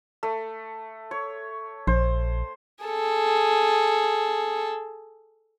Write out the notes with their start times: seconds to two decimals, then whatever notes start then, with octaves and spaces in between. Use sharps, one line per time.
0.23 A3
1.11 C#5
1.87 A#1 C5
2.85 G#4 A4